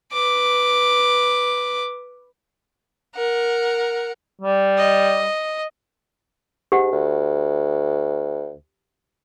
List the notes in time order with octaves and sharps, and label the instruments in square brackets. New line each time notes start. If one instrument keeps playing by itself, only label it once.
[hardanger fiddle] B4 D6
[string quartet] A#4 F#5
[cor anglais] G3
[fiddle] D#5
[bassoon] G#2 [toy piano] G4 F#5
[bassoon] D2